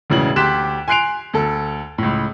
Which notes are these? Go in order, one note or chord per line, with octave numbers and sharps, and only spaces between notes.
E1 A2 C#3 E3 F#7
D2 G4 C6 F#6 B6 E7
G#5 C6 F#6 C7 D7 F7
D2 A4
C#2 A2